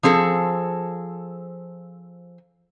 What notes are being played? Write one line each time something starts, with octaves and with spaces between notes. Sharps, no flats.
F3 C4 G#4 A4